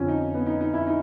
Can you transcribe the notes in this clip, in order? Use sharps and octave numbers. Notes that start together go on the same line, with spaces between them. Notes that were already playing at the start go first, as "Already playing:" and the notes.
Already playing: F2 D3 F3 C#4
D#4
B3
D#4
D#4
E4
D#4